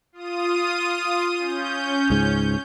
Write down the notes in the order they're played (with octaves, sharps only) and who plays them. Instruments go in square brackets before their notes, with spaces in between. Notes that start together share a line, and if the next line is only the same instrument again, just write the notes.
[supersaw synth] F4 D#6 D#7
C#4 G6
[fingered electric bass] C#2 G#2 C#3